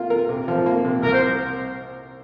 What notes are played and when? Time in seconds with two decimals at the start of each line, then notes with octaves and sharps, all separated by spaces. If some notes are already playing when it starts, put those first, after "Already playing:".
Already playing: A#3 F4
0.10 A#4
0.29 C3
0.48 F3
0.66 A#3
0.85 C3
1.03 C2 A#4
1.13 C5